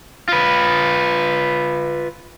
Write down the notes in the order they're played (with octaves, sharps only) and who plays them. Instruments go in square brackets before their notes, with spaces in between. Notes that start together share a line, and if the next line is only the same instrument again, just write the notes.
[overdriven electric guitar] F4 B4